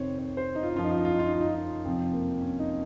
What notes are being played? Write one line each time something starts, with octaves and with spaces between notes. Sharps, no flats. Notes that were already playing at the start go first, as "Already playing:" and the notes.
Already playing: F2 C3 D#3 C5 C#5
C#5
C5
D#4
F4
D#4
F#2 F3 F4
D#4
F4
D#4
F4
D#4
F4
D#4
F4
D#4
F4
D#4
F2 C3 F3 C4
A#3
C#4
D#4